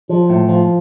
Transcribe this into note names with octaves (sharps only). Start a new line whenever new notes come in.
F3
A2
F3